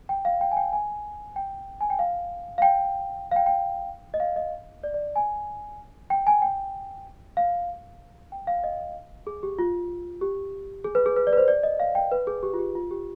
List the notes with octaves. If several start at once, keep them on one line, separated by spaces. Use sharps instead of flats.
G5
F5
G5
G#5
G5
G#5
G5
G#5
G5
F5
F5
G5
F5
G5
G5
D#5
F5
D#5
D5
D5
G#5
G5
G#5
G5
F5
G5
F5
D#5
G#4
G4
F4
G4
G#4
B4
G#4
B4
D5
B4
C5
D5
D#5
F5
G5
B4
G#4
G4
F4
G4
F4
G4